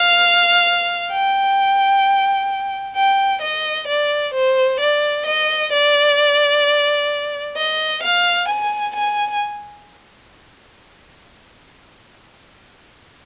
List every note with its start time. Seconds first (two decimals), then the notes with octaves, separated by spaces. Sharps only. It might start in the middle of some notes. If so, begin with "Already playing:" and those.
Already playing: F5
1.11 G5
2.96 G5
3.42 D#5
3.87 D5
4.34 C5
4.80 D5
5.26 D#5
5.72 D5
7.56 D#5
8.03 F5
8.48 G#5
8.95 G#5